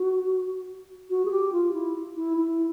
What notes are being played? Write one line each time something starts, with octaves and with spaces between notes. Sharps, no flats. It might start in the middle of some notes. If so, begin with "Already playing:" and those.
Already playing: F#4
F#4
G#4
G4
F4
E4
E4
E4